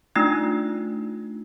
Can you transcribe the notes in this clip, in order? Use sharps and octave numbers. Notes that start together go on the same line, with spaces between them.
A3 D4 D#4 F4 E6